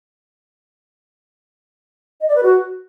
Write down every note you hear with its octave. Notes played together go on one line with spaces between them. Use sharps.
D#5
D5
B4
F#4